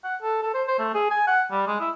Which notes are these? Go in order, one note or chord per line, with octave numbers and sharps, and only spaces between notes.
F#5
A4
A4
C5
C5
A3
G#4
G#5
F#5
G3
G#3
E4